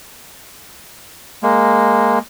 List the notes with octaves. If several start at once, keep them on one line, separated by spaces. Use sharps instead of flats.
G#3 A#3